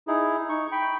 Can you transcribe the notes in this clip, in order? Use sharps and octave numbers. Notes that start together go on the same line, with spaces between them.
D#4 E4 G#4
D#4 C#6
G5 B5